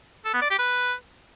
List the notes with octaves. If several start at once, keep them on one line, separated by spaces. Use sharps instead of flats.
A4
B3
D5
G4
B4